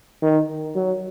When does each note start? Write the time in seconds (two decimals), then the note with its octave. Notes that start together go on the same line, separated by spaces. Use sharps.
0.22 D#3
0.76 F#3